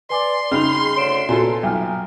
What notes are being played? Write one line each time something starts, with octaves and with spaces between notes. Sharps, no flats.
B4 D5 G#5 C6 D6
C#3 D#4 G#4 G5 B5 F6 F7
D2 C#5 D7 E7
A#2 B3 F4 F#4 A4 G#5
B1 G5 G#5 F6